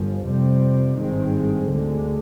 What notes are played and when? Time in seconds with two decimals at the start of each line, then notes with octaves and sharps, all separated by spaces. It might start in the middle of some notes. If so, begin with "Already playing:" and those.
Already playing: G1 G2 F3
0.26 F2 C3 G3 C4
0.97 G#1 G2 D#3 G#3 C4
1.68 D2 D3 G#3